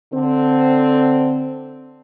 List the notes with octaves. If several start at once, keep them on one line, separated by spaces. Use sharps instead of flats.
D3 C4